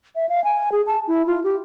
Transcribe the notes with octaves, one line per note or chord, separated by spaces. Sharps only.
E5
F5
G#5
G#4
A5
E4
F4
G4